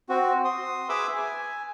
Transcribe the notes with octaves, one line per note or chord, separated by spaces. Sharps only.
C4 F#4
C6 D#6
G#4 B4 E5 B5 D6 E6
G#5